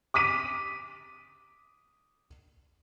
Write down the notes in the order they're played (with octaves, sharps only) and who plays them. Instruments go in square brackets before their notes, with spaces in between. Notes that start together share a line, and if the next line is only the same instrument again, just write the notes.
[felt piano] D6 D#6 B6 D#7